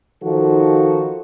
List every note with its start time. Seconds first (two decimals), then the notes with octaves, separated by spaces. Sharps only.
0.23 D#3 F3 D#4 F#4 A4